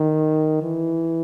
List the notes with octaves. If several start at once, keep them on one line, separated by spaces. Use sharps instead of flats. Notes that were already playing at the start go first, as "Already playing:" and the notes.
Already playing: D#3
E3